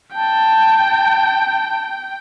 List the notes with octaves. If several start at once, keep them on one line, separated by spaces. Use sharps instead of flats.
G5 A5